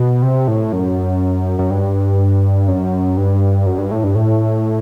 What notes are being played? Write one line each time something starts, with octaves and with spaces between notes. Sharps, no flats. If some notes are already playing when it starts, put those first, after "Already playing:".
Already playing: B2
C3
A2
F#2
F#2
G2
F#2
G2
F#2
G2
A2
G2
A2